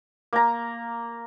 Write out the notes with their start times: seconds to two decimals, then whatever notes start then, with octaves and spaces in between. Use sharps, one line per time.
0.33 A#3 A#5